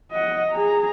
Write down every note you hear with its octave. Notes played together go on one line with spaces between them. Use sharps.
D#5 F#5
G#4 A#5